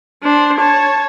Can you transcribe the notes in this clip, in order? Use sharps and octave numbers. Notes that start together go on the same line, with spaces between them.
D4 C5
C#5 A5